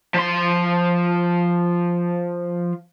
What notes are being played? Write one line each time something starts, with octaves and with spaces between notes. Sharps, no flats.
F3 C6